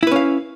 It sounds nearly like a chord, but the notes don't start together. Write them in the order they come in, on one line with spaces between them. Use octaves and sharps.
E4 B4 C#4 F5